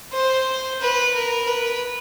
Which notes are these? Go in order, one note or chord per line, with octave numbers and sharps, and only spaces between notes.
C5
B4
A#4
B4